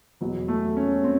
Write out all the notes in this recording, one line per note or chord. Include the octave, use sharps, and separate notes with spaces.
E2 B2 F#3
A3
C#4
C4